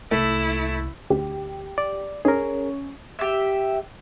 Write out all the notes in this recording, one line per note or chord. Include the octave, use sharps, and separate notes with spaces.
C2 A3 A#3 E4
D2 G4
D5
C#4 G#4 A#4
G4 E5